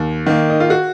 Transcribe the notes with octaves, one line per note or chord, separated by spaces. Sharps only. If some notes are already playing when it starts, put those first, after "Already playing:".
Already playing: D#2
D#3 A#3
D#4
F4
F#4